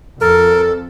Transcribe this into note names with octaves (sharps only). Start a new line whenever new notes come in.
F2 A4 A#4